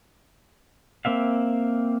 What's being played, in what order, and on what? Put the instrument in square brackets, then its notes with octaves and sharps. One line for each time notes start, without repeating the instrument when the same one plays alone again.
[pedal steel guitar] A#3 C4 E5 F5